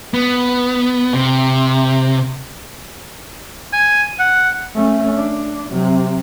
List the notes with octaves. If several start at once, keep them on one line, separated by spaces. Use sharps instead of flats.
B3
C3
G#5
F#5
A3 C#4
D4
C3 F#3